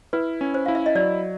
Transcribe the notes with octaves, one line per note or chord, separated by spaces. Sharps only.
E4 B4
C#4
C5
E4 F5
E5
D#5
F#3 D5